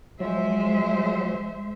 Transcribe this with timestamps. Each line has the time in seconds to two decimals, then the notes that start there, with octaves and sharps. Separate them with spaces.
0.20 F3 F#3 G#3 C5 E5